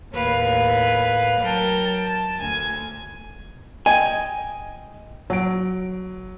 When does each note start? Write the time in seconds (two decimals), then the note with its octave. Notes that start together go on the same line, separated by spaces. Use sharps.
0.13 D#2 A2 B4 C#5 F5
1.40 F#3 A#4 G5 A5
2.05 A5
2.39 D2 G#5
3.86 D#5 G5 G#5
5.30 F#3 D7